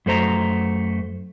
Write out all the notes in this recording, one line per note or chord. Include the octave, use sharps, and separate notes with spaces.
F#2 A3 C5 A#5